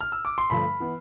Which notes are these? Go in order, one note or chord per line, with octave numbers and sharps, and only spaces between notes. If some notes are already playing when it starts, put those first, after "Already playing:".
F6
E6
D6
C6
G2 D3 F3 A3 B5
E3 B3